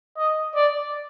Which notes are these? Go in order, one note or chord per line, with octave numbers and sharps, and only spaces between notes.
D#5
D5